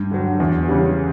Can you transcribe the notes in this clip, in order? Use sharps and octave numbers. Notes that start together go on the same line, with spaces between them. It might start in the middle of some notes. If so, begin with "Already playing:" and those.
Already playing: G2
D3 F#3
E2
C#3 E3 G3